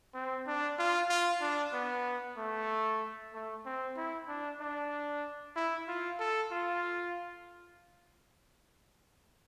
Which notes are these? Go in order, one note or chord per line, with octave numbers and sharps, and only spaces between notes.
C4
D4
F4
F4
D4
B3
A3
A3
C4
E4
D4
D4
E4
F4
A4
F4